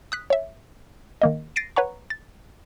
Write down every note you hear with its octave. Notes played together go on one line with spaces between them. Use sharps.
D#6 F#6 B6
C#5 E5
D#3 A#3 D#5
A6 A#6 C7 D7 D#7
B4 C#5 F#5 A#5 C#6
A6